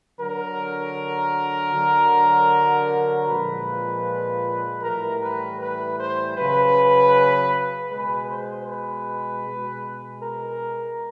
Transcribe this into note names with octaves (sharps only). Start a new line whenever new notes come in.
D3 F#3 A#4
D3 F#3
A#2 F3 G#3 B4
A2 E3 G3 A#4
B4
B4
C5
C#3 F#3 B4
B2 G#3 B4
C5
B4
B2 G#3
A#4